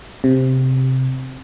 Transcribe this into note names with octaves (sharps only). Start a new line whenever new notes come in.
C3